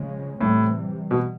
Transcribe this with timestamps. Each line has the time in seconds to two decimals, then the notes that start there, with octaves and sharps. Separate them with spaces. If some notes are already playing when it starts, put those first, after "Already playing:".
Already playing: C#3 F3 G#3 C#4
0.41 A2 C3 E3 G3
1.11 B2